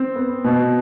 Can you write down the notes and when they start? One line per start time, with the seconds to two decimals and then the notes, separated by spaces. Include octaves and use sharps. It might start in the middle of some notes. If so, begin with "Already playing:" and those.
Already playing: C4
0.15 B3
0.44 B2